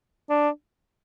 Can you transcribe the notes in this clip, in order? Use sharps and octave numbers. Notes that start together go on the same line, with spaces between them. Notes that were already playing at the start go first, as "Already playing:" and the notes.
D4